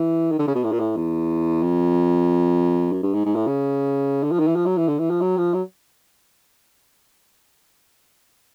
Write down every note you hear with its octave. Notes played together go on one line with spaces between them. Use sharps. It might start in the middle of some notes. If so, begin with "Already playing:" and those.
Already playing: E3
D#3
D3
C#3
B2
A2
A#2
A2
E2
F2
F#2
G2
G#2
G#2
A2
C#3
D3
F3
D#3
E3
F3
F#3
E3
D3
E3
F3
F#3
F3
F#3